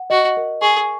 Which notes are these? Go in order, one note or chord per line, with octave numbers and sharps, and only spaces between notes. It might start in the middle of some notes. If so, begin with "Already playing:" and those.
Already playing: F#5
F#4 D#5
A#4
G#4 C#6